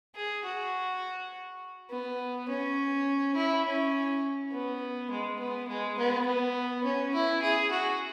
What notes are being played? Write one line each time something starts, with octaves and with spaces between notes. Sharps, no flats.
G#4
F#4
B3
C#4
E4
C#4
B3
G#3
B3
G#3
B3
B3
C#4
E4
G#4
F#4